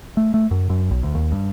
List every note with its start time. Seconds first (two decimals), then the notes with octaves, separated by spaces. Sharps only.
0.17 A3
0.34 A3
0.51 F#2
0.70 F#2
0.91 B1
1.03 D2
1.15 D#2
1.32 G2